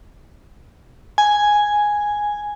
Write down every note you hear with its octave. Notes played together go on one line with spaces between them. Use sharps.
G#5